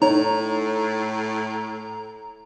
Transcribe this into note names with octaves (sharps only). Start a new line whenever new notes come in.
A2 D#4 C#5 A#5